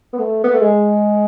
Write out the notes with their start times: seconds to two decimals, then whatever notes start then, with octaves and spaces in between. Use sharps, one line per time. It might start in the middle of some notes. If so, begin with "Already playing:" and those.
0.13 B3
0.19 A3
0.44 B3
0.53 A3
0.61 G#3